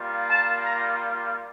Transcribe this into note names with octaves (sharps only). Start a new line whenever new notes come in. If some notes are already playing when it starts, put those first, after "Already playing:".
Already playing: G3 A#3 F4
A5
A#5